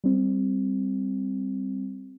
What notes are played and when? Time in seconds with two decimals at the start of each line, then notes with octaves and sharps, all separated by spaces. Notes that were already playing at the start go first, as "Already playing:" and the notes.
0.04 G3 C4